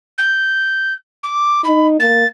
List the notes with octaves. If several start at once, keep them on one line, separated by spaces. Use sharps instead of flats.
G6
D6
D#4 B5
A#3 A6